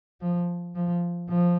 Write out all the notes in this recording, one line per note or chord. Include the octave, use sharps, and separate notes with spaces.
F3
F3
F3